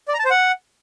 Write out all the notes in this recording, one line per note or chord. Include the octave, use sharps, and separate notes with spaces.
D5
A#5
A5
C5
F#5